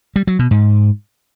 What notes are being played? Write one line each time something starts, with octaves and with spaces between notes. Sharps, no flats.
G3
F#3
B2
G#2